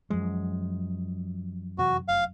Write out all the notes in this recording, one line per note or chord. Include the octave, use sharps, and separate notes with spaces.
F#2 F3 F#3 G#3
F2 C3 E3 F#4
F1 F5